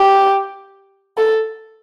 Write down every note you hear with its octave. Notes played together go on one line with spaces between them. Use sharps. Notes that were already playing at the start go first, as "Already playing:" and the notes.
Already playing: G4
A4